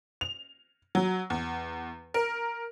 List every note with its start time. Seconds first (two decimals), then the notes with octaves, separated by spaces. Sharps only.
0.21 F7
0.95 F#3
1.30 E2
2.14 A#4